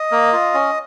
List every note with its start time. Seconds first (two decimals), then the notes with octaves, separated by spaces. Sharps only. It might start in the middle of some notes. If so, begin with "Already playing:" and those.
Already playing: D#5
0.12 A#3
0.33 F4
0.54 C#4